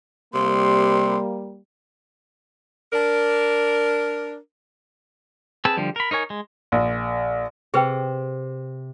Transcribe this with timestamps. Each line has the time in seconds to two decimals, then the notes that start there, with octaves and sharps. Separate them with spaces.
0.34 C3 G3 A#3 C6
2.93 D4 A#4
5.65 C4 G#4 B4 A5 E6
5.77 D3 F3 G3
5.96 A#4 B5
6.11 D#4 A#4 C#5 G#5
6.30 G#3
6.72 A#1
7.74 C3 G#4 B4 G5